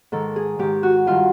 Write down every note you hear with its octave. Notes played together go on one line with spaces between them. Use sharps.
G#2 D#3 A4
G#4
G#2 D#3 G4
F#4
G2 D#3 F4